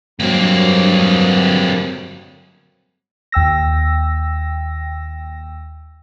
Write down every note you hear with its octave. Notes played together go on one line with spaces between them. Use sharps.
G2 F#3 A#3 C4
D#2 G5 E6 A#6